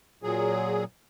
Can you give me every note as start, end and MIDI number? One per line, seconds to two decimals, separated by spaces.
0.23 0.84 46
0.23 0.84 54
0.23 0.84 68